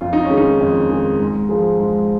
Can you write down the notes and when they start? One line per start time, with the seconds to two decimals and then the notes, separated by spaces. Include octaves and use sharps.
0.01 F2 F4
0.13 D#4
0.25 C#4
0.30 D#3 G#3
0.37 D#4
0.60 F2
0.90 D#3 G#3
1.20 G#2
1.49 F3 G#3
1.79 G#2